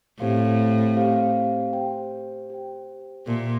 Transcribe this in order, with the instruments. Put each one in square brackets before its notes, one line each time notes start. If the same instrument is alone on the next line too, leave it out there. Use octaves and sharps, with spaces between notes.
[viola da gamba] A2 [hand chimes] C4 G4 C5 F5
[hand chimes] C4 G4 C5 F5
G4 C5 G5
G4 C5 G5
[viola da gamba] A#2 [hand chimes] G4 A#4 E5 A5